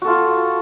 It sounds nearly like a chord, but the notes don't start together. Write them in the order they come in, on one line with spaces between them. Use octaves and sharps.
F#4 A4 F4